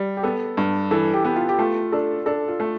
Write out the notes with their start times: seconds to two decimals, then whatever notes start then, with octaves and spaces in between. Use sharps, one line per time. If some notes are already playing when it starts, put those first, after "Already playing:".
Already playing: G3
0.17 G4
0.23 B3 A4
0.57 G2
0.91 E3 A4
1.14 G4
1.25 B3 G4
1.36 F4
1.49 G4
1.59 A3 F4
1.92 D4 A4
2.26 D4 A4
2.48 F4
2.60 A3